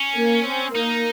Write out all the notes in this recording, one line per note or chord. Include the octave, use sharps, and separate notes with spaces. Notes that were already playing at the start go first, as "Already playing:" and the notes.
Already playing: C#4
A#3
C4
A#3 D#4